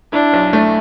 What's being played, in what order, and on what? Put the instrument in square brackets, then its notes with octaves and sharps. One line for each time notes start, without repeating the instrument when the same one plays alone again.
[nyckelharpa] D4 [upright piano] E4
[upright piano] B1
A3